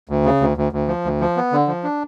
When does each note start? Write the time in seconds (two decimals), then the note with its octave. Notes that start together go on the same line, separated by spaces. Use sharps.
0.09 D2
0.25 C#3
0.41 D2
0.57 D2
0.72 D2
0.88 F3
1.05 D2
1.20 F3
1.37 B3
1.52 D3
1.68 F3
1.83 D4